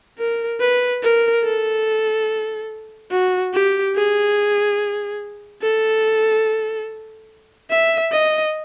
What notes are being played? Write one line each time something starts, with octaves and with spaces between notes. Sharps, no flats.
A#4
B4
A#4
A4
F#4
G4
G#4
A4
E5
D#5